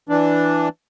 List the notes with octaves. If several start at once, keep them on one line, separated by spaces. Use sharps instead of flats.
E3 D4